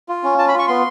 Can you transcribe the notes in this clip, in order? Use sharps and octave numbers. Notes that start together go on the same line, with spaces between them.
F4
C#4
F4 A5
B5
F4
C#6
B3 C6